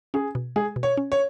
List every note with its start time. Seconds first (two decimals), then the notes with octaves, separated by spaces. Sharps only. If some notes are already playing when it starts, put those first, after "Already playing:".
0.14 C#4 G#4
0.35 B2
0.56 G#3 G#4
0.76 B2
0.83 C#5
0.97 C#4
1.12 C#5